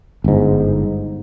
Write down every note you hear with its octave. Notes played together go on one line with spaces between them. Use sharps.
G1 G#2